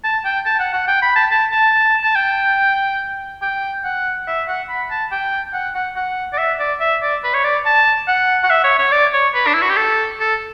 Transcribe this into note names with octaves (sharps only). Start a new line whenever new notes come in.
A5
G5
A5
F#5
F#5
G5
B5
A5
A5
A5
A5
G5
G5
F#5
E5
F#5
B5
A5
G5
F#5
F#5
F#5
D5
E5
D5
E5
D5
B4
C#5
D5
A5
F#5
F#5
E5
C#5
C#5
D5
C#5
B4
D4
E4
F#4
G4
A4
A4